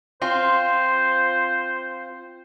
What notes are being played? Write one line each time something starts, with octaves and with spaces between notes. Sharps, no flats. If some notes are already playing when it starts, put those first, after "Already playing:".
C4 F4 C5